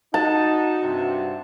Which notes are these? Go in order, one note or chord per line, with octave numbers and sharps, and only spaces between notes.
D#4 F#4 A5
G2 C3